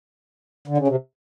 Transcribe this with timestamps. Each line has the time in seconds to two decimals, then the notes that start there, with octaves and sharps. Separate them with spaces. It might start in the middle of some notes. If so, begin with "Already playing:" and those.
0.68 D3
0.78 C#3
0.88 C3